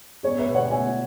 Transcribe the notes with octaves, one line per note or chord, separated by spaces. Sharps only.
B3 G#4 C#5
B4 E5
B2
C#5 F#5
F#5
B2 E5 G#5